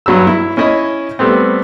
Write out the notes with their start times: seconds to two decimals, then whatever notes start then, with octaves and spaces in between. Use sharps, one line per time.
0.06 G2 F#3 B5 E6
0.27 E4
0.57 C#4 E4 D#5 B5
1.19 G3 A3 B3 C4